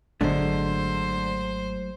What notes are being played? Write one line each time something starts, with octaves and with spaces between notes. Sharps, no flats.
G#1 D3 F#3 G#3 A3 C5